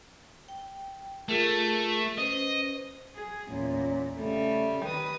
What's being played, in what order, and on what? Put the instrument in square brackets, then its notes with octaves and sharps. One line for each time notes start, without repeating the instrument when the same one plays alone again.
[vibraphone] G5
[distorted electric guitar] A3 [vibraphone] F4 G#4 A#4
[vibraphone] C#4 B4 C5 [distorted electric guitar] D#5
[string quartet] G#4
[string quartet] E2 A#2 [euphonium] C#4
[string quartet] C#3 G3 [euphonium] A3
[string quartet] D#3 B4 D#6